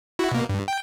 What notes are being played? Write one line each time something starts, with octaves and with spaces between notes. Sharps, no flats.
E4 F#4
B2 A#3
G2
G5